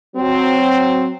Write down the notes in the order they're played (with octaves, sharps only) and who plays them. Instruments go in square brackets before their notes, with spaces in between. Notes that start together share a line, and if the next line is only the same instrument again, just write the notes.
[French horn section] F#3 C4